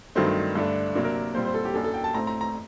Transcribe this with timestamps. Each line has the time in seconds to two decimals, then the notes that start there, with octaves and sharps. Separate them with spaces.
0.15 G2 D#3 F#3 A3 C4 C5
0.55 G2 D3 A3 D4
0.95 C3 F#3 A#3 D4
1.05 A#4
1.35 A#2 G3 C4 C5
1.45 C5
1.54 A4
1.65 G4
1.74 F#2 F#3 A#3 D4 A4
1.84 A4
1.94 G5
2.04 A5
2.14 A2 A3 C4 A#5
2.27 A#5
2.41 A#5